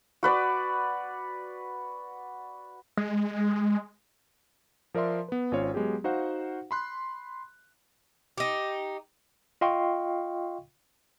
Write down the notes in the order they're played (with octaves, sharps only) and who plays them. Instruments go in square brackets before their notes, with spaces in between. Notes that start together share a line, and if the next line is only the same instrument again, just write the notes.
[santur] F#4 B4 D5
[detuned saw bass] G#3
[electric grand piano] F3 A#4 D5 E5 C6
B3 B4
G#1 C#4 F4 C5 C#5
F#3 G#3 B3 G4 G#4
D#4 F#4 C5 F5 F#5
B5 C6 F#6
[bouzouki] D#4 G4
[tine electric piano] F4 D#5 F5 G5 C6 C#6